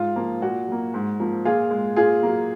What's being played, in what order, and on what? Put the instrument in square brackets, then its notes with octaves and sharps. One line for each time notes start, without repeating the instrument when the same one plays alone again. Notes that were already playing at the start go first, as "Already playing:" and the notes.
Already playing: [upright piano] G#2 F4
F3 A#3
A#2 F#4
F#3 A#3
G#2
F3 A#3
A#2 F4 G#4
G#3
A#2 F4 G#4
F#3 A#3